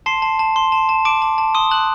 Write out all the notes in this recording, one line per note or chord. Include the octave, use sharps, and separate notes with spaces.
A5 C6 C7
A5
A5
C6
A5
A5
A5 D6 D7
A5
A5
C6 D#6 D#7
A5 F#6 F#7